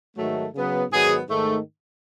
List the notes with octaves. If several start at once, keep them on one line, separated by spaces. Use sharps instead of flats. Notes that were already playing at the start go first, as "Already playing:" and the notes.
G#2 D#3 F#3 A3
C#3 F#3 B3
G#2 D#3 F#3 B3 G#4
G#2 D#3 A3